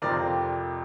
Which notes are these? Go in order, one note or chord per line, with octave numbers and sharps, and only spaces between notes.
F2 C3 F3 C4 A#4 D5